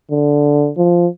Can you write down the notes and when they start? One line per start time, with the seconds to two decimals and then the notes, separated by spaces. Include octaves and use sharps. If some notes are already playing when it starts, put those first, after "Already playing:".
0.11 D3
0.77 F3